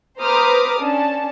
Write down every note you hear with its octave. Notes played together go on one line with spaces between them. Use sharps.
B4 C5 A#5 D6 D#6 F6
C#4 D4 A5